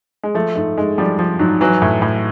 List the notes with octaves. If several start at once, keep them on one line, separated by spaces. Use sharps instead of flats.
G#3
F3 A3
G#2 A3
G#2 G#3
F3 G3
F3
G#2 F#3
E3 F#3
A2
A2